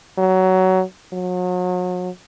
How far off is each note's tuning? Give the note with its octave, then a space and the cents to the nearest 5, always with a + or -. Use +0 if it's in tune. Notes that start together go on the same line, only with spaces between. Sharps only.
F#3 +15
F#3 -35